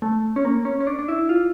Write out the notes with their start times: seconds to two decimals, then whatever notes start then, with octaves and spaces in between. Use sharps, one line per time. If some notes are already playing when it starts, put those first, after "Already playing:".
0.02 A3
0.36 C#4
0.45 A#3
0.65 C#4
0.80 C#4
0.87 D4
0.99 D4
1.08 E4
1.29 F4